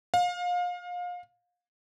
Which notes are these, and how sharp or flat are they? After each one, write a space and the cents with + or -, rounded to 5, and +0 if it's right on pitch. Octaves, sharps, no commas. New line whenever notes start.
F5 +30